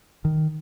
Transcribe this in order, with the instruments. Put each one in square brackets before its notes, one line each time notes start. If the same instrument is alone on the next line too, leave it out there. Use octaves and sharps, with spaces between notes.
[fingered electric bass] D#3